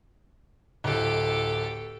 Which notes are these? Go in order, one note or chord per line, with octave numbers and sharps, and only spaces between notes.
D1 G4 A4